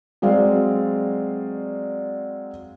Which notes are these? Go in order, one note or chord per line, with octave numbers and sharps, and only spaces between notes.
F#3 G#3 C4 D5 F5